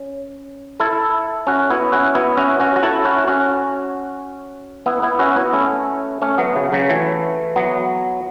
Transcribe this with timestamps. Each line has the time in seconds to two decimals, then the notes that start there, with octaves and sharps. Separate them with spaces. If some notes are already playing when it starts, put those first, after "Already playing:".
Already playing: C#4
0.80 E4 A4
1.47 C#4 F#4
1.70 B3 E4
1.92 C#4 F#4
2.15 B3 E4
2.37 C#4 F#4
2.60 C#4 F#4
2.76 F#4
2.83 E4 A4
3.05 C#4 F#4
3.28 C#4 F#4
4.86 B3 E4
5.02 B3 E4
5.19 C#4 F#4
5.36 B3 E4
5.53 A3 C#4
6.22 A3 C#4
6.38 F#3 B3
6.56 C#3
6.72 C#3 F#3
6.89 E3 A3
7.56 F#3 B3